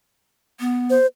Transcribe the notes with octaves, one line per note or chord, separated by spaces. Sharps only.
B3
C5